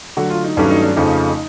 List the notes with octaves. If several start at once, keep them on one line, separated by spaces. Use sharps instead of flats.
D3 F#3 A3 F#4
F4
D#4
G2 D#3 F#3 A3 C#4 D4
D#4
D4
F2 C#3 F3 A3 C#4 D#4